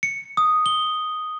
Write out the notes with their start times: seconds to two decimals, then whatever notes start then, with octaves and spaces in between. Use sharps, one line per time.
0.03 C#7
0.37 D#6
0.66 G7